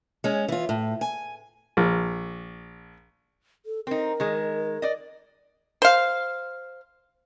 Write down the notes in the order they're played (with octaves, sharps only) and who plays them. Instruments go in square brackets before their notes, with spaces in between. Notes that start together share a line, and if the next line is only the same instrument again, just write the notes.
[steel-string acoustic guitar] G#3 C#4
E3 F4
A2
G#5
[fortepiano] A#1
[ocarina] A4
[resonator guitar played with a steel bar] C4 D#4 [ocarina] A#4
[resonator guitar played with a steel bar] D#3 G#3
D5 D#5
[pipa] C5 F5